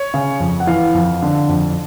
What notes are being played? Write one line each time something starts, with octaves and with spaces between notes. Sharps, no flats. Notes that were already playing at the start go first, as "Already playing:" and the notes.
Already playing: C#5
C#3
F2
F#5
E3 F5
F2
D3
F2